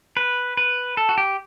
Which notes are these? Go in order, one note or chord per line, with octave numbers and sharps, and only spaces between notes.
B4
B4
A4
F#4
G4